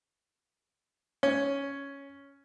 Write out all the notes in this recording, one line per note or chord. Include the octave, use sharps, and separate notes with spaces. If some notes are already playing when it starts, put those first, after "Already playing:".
C#4